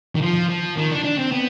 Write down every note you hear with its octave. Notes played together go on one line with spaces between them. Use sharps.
D#3
F3
F3
D#3
D4
D4
C4
B3